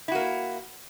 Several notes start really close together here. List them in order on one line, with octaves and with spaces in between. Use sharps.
E4 F#4 A#3